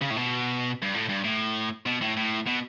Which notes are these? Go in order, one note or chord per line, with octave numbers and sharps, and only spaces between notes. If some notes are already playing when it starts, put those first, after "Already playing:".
C#3
A2
B2
G2
A2
G2
A2
B2
A2
A2
B2